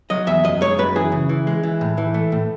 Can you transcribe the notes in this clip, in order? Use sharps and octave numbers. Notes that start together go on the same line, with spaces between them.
F#3 D#5
E2 E5
F#2 D#5
G#3 C#5
F#2 B4
E3 G#4
C#3
E3
G#3
E3
A2
E3
A3
A2